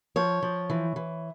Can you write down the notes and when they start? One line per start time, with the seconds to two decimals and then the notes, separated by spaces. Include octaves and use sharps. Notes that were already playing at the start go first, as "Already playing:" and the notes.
0.16 F3 C#5
0.42 F3
0.70 E3
0.96 E3